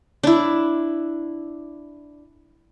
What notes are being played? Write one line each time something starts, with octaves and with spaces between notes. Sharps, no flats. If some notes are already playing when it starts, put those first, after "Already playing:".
D4 E4